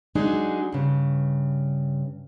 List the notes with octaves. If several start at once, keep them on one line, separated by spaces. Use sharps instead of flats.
F#3 G#3 D4 D#4 G#4
G2 C#3